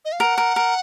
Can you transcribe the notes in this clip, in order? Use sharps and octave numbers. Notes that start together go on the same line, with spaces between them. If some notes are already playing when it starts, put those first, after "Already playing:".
D#5
F5
A#4 F#5
A#4
A#4